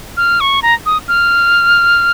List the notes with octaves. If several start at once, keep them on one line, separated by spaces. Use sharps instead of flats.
F6
C#6
A#5
D#6
F6